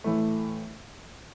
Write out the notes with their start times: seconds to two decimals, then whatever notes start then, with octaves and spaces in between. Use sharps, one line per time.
0.04 A2 E3 A3